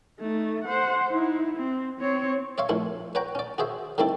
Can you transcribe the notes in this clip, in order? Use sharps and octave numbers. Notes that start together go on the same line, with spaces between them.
A3 D#4
C5 F#5
D#4 E4
C4
C4 C#5
C#5 E5 F5 C6
A#1 A2 E4 C6
B4 C#5 F#5 G5 A#5
C#4 D5
F#4 G#4 C5 E5
D3 D#3 G3 C4 E4 A4